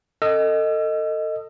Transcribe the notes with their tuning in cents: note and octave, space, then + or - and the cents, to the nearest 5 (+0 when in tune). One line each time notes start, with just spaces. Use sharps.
A4 +30 D#5 +0 E6 +35